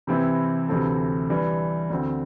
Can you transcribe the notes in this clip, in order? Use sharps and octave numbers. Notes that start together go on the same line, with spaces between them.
C3 E3 C4 E4
D2 C3 E3 C4 A4
E3 G3 D4
D2 D3 C4